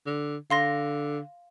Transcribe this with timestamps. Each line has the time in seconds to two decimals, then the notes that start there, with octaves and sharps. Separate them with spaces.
0.06 D3
0.50 D3 F5 C6 A#6